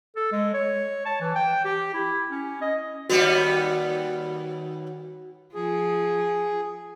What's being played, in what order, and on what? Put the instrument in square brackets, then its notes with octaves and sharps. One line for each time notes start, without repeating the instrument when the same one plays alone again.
[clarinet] A4
G#3
C#5
A5
E3
G5
G4
E4
C#4
D#5
[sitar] D#2 G3 B3 [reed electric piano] F#4
[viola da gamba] F3 [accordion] G#4